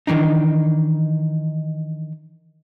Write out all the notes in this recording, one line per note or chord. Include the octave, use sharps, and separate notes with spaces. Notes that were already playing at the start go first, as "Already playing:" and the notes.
D#3 E3 D4 D#4